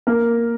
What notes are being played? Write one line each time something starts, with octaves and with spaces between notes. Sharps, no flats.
A#3 A#4